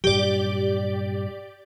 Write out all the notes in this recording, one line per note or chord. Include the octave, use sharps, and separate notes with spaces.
G2 A#2 F#3 G4 D5